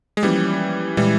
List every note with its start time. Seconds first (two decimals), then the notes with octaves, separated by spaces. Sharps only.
0.17 G#3
0.23 E3 F3 G3 A#3 C#4
0.97 A#2 E3 G3 G#3 E4